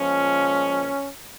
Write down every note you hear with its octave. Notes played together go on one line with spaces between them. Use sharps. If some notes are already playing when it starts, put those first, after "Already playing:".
Already playing: A#2 F3 G#3 C#4